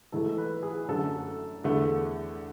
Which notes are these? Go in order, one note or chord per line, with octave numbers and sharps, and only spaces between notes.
G#2 E3 A3 A4
B4
G#4
F#2 D3 A3 A4
E2 D3 A3